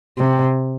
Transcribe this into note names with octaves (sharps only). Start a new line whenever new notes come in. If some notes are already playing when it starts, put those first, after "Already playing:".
C3